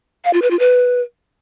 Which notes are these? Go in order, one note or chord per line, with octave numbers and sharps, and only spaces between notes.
F5
F4
B4
F4
B4